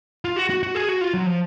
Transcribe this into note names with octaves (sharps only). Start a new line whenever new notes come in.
F4
F#4
F#4
F#4
G#4
F#4
F4
F#3
F3